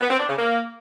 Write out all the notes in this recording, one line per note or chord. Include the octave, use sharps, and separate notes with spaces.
B3
C4
D4
C#3
A#3